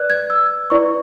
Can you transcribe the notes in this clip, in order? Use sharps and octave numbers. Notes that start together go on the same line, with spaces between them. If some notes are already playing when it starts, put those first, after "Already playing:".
Already playing: B4 D5 F#6
G#6
E6
E4 B4 D5 C#6